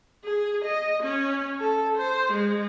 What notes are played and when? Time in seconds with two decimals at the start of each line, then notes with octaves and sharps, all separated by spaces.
0.24 G#4
0.64 D#5
1.03 C#4
1.59 A4
1.97 C5
2.32 G#3